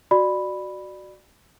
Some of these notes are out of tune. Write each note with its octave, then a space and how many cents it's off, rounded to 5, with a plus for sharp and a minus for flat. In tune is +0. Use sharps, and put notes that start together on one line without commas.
F#4 +0 D5 +20 B5 +0